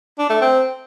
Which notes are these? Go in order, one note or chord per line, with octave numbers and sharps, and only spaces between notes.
D4
A3
C4